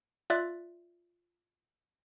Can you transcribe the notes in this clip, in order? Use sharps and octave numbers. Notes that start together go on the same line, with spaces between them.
F4 D5 E5 F#6 A6